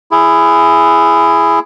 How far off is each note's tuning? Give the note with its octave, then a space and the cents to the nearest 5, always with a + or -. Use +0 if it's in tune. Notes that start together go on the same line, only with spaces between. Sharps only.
E4 +15 G#4 +0